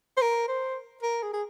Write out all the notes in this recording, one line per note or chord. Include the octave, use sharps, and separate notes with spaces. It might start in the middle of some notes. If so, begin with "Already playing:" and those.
C5
A#4
C5
A#4
G#4
G#4